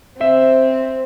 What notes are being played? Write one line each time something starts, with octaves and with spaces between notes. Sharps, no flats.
C4 C5 E5